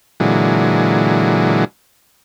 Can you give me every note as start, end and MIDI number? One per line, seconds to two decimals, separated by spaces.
0.20 1.65 46
0.20 1.65 50
0.20 1.65 52
0.20 1.65 54
0.20 1.65 56